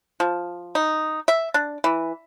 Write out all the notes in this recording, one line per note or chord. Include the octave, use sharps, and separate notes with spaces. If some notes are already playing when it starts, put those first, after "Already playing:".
F3
D#4
E5
D4
E3